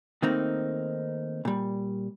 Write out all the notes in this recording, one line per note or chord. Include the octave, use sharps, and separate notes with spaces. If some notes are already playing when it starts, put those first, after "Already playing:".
D#3 A3 A#3 C4 D#4
A#2 G3